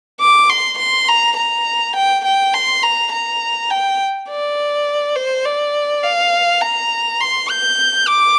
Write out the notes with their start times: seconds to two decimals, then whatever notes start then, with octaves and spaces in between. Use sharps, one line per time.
0.21 D6
0.50 C6
0.78 C6
1.08 A#5
1.37 A#5
1.96 G5
2.25 G5
2.54 C6
2.83 A#5
3.13 A#5
3.70 G5
4.29 D5
5.16 C5
5.46 D5
6.04 F5
6.62 A#5
7.20 C6
7.50 G6
8.07 D6